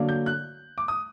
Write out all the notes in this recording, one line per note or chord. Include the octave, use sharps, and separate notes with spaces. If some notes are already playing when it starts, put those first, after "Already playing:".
Already playing: D3 F#3 A#3 D4
G6
F#6
D6
D#6